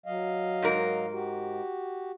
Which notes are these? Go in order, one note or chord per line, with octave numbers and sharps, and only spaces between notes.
F#3 D#5 F5
G#2 A#4
F#4 G4